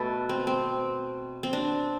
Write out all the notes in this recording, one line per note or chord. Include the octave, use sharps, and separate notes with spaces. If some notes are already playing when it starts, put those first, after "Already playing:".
Already playing: B2 A3 A4 B4
C4
C4
C4
D4